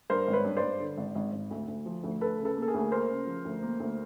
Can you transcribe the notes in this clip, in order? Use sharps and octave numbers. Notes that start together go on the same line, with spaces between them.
G2 A#4 C5
G#1
B4 C#5
G2
C5 D5
G2
D3
G#1
G#1
G#1
D2
D2
F3
D2
D2 A4 B4
C#3
A4 B4
A#3
A4
G#4 A#4
D2
A#3 A#4 C5
C#3
F3
D2
A#3
D2